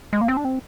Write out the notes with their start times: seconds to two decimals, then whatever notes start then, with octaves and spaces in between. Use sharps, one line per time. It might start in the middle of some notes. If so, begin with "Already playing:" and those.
0.13 G#3
0.21 A#3
0.28 C4
0.37 D4
0.45 C4